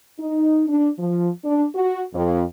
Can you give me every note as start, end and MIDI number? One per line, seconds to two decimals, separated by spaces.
0.20 0.64 63
0.68 0.88 62
0.99 1.30 53
1.45 1.65 62
1.75 2.03 66
2.14 2.44 41